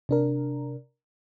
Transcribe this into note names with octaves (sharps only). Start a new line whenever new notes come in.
C3 D4 A#4